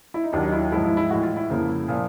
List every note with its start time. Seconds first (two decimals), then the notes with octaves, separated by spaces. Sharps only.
0.14 E4
0.24 D#4
0.33 D#2 D#3 F#3 D4
0.43 D#4
0.52 E4
0.72 G#2 F3 G#3 E4
0.84 E4
0.97 E4
1.10 A2 E3 G#3 F#4
1.23 F4
1.37 E4
1.50 F2 C#3 F3 A#3
1.88 A#2 F3